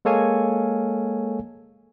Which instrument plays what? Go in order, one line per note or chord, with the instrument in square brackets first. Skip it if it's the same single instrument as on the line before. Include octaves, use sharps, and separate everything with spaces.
[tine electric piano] G#3 A#3 A4 C#5 F5 G#5